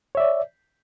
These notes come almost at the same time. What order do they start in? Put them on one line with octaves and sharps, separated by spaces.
C#5 E5 D5